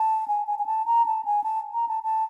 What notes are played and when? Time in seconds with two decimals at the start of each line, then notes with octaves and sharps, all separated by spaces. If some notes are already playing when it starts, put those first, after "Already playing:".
Already playing: A5
0.28 G#5
0.47 G#5
0.59 G#5
0.66 A5
0.86 A#5
1.06 A5
1.25 G#5
1.44 A5
1.73 A#5
1.88 A5
2.03 A5